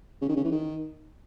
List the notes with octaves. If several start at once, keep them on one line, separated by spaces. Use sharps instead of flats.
C#3
D#3
C#3
E3
D#3